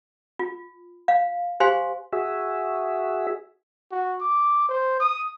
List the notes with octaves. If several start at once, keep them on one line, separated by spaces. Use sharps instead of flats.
F4
F5
G4 C5 F5 G#5 C6
F#4 G#4 E5
F#4
D6
C5
D#6